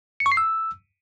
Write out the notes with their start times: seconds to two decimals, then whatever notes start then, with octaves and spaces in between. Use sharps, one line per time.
0.20 C#7
0.26 C#6
0.32 C7
0.37 E6